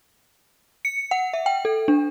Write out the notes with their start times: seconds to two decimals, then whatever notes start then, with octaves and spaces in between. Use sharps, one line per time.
0.85 C#7
1.11 F#5
1.33 E5
1.46 G5
1.65 A4
1.88 D4